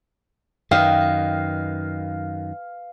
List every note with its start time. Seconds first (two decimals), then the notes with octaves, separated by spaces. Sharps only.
0.71 F#2 D#3 B4 D#5 F5 G5